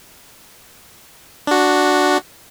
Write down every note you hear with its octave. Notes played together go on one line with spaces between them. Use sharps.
D4 F#4